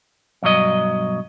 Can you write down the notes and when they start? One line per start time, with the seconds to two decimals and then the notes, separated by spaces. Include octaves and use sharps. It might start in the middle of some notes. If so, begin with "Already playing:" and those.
0.43 B1 G2 F#3 D#5